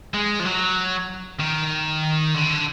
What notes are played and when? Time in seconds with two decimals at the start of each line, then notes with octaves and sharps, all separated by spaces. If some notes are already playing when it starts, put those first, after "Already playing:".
0.14 G#3
0.40 F3
0.45 F#3
1.40 D#3
2.34 D3